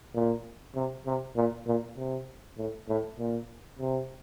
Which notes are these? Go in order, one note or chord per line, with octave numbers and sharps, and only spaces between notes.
A#2
C3
C3
A#2
A#2
C3
A2
A2
A#2
C3